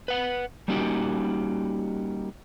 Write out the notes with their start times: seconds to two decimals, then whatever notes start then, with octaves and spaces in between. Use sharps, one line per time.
0.08 B4 F#5
0.68 G3 A#3 C#4 D#4 F#4 G4